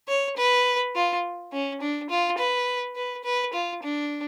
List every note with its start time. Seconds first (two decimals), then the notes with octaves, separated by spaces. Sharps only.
0.08 C#5
0.37 B4
0.95 F4
1.52 C#4
1.81 D4
2.10 F4
2.38 B4
2.96 B4
3.24 B4
3.53 F4
3.82 D4